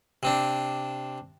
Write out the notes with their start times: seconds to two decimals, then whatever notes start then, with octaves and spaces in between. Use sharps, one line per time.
0.23 C3 C4 D4